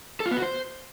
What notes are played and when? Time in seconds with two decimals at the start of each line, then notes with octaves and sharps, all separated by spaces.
0.20 A4
0.26 F4
0.31 B3
0.37 F#4
0.42 C5